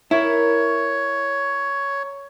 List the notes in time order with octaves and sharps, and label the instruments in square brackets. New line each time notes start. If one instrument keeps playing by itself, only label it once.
[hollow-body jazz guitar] E4 [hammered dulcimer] A#4 [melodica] C#5